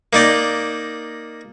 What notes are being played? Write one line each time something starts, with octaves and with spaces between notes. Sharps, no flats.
A#3 D#4 D5 G5